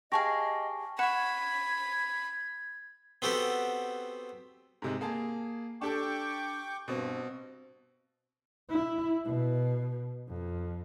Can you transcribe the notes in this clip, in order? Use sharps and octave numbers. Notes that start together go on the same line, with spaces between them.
G4 G#4 D#5 F5 A5 C#6 A#6
F#5 B5 C#6 G#6 E7
B3 C4 F#4 G4 A4
G#2 C3 G#3
A#3 G#4 A5
D4 G4 A4 G5 C#6 D6
G2 B2 C4
E4
B2
F2